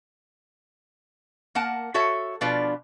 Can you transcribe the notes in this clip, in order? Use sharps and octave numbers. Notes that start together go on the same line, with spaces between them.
A#3 A#4 F#5 A5
F#4 A4 C#5 E5
B2 F3 D4 F4 B4 D5